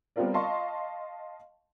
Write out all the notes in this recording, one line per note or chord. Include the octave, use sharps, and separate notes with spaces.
G3 B3 C4 F4 A#4 D5
D#5 F5 A5 C6 C#6